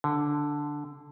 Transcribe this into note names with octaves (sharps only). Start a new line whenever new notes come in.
D3